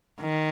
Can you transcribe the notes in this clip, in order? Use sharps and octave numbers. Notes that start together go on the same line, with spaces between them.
D#3